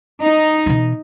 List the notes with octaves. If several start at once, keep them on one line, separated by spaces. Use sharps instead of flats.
D#4
B2 E3